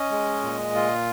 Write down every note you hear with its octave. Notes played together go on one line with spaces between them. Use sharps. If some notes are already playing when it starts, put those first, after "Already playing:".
Already playing: C#4 D#5
G#3
A#2
F4